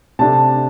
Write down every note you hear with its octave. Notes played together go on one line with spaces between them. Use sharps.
C3 A3 D4 A5